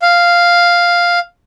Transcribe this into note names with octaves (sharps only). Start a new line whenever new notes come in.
F5